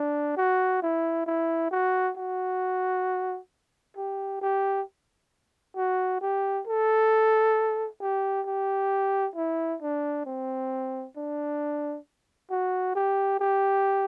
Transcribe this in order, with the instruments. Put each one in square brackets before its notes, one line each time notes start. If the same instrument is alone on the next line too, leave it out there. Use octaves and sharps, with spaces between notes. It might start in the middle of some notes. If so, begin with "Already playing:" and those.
Already playing: [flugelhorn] D4
F#4
E4
E4
F#4
F#4
G4
G4
F#4
G4
A4
G4
G4
E4
D4
C4
D4
F#4
G4
G4